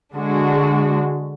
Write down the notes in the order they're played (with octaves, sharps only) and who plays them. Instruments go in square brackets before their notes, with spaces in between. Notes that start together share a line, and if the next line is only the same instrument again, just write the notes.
[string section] D3 G#3 D4 F#4